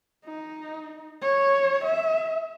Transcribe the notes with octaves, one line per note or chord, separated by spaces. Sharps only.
D#4
C#5
E5